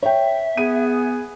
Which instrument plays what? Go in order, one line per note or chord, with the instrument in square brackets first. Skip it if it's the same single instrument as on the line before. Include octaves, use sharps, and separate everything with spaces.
[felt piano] C#5 G5 [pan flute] E5
[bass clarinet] B3 [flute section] G#4 [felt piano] D#7